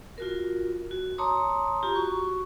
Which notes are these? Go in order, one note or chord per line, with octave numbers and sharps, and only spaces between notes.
F4 F#4 A#4
F#4
C#5 A5 A#5 C6 D6 D#6
F4 G4 A#5
F#4 C#6